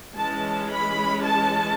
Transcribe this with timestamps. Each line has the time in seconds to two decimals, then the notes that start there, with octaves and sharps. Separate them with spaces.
0.16 E3 G#3 C#4 A5
0.71 B5
1.25 A5